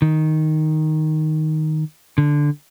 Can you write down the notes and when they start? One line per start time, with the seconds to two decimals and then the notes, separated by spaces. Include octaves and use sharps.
0.02 D#3
2.18 D3